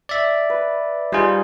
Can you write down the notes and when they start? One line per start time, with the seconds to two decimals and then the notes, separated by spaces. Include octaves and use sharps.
0.09 D5 E5
0.50 B4
1.12 G3 D#4 F4 G#4 C5